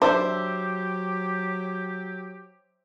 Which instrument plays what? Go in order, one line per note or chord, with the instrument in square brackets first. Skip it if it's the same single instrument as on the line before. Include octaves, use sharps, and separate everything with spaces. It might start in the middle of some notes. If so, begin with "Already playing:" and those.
[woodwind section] F#3 G4 [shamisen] D4 [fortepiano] C5 E5 D6